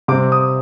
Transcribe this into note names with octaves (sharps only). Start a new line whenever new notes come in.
C3 G3 C4 D6
D#6